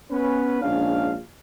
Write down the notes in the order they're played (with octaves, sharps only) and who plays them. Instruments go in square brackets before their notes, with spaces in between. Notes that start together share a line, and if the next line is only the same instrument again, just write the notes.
[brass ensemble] B3 C#4 B4
A#1 G#2 C#4 D4 F5